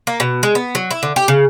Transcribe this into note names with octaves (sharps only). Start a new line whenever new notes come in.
A#3
B2
G#3
B3
F#3
E4
D3
G4
C#3